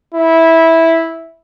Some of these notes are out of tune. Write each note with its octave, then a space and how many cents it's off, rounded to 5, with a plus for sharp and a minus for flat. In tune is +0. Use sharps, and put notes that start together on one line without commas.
E4 -10